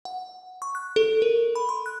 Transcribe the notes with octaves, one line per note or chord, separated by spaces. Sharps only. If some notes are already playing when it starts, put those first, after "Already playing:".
F#5
C#6
F#6
A4
A#4
B5
C6
F#6